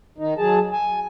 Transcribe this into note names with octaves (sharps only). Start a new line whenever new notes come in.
D#3 D#4
F#3 G#4 A5
G#5